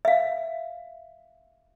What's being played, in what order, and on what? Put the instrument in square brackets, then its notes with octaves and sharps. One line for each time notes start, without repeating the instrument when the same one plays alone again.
[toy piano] E5 F5